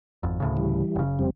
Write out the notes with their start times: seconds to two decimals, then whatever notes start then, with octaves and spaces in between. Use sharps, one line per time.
0.23 G#1 F2
0.40 D2 A2 C#3
0.57 E3 G3
0.95 F#1 C#3
1.19 F2 G3 C4